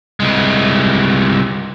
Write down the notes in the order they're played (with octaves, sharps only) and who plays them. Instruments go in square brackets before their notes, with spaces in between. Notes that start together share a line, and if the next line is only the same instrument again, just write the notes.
[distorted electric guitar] C2 G#3